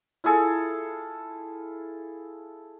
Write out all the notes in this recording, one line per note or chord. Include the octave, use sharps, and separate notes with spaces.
E4 F4 G#4 A4